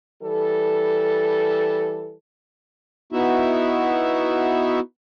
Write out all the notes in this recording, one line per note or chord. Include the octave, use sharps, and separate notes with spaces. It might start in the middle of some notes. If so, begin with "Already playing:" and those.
E3 G3 A4
B3 D#4 E4 F#4 E5